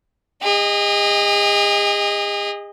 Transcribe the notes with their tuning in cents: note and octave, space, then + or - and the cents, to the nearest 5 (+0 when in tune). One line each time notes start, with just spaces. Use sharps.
G#4 -40 D#5 +0